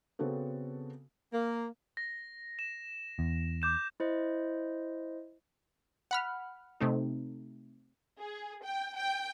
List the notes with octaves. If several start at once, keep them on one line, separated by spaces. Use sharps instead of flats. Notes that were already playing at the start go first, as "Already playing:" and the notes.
C#3 B3 C4 F#4 A4
A#3
A#6
E7
E2
D6 G6 E7
E4 C5 D#5
F#5 B5 F6
C3 A3 D#4
G#4
G5
G5